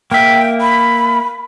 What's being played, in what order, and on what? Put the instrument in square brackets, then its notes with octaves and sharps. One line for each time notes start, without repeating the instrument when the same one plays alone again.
[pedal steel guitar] A#3 E5 [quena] G5
[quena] B5